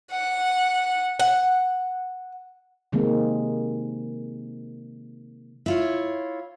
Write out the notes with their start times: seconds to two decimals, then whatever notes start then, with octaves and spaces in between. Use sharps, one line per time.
0.12 F#5
1.19 F#5
2.92 C3 D#3 G#3 A#3 C4
5.66 E4 F4 C#5